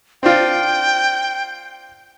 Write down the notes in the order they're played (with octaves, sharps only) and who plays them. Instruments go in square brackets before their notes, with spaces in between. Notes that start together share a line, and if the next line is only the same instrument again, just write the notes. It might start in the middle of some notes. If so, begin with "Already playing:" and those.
[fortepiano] C4 D4 F4 [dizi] G5